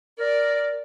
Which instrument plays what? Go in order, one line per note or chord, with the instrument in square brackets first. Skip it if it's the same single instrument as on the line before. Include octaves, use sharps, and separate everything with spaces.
[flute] A#4 [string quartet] D5